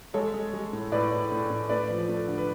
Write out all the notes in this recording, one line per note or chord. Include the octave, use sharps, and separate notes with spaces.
G#3 A4 C#5
G#3
G#3
A2
A2 B4 D5
A2
A2
A2
A3 B4 D5
F3
A3
D3
B4